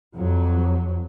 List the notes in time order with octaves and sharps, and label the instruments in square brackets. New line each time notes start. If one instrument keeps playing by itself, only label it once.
[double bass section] F2 F#3